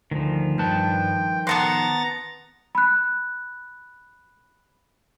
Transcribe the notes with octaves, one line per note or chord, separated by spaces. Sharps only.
D2 D#3 F3
G2 B4 G5 A5
B3 C4 B4 F#5 A5 A#5 C6 A6
B5 F#6